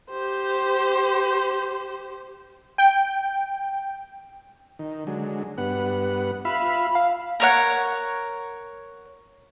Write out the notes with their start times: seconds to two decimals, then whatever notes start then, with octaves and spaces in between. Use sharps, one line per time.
0.11 G4 C5
2.78 G5
4.79 D#3
5.07 D3 F#3 G#3
5.58 G2 B3 F#5
6.45 F4 E5 F5 B5
6.95 F5
7.40 A#4 C#5 F#5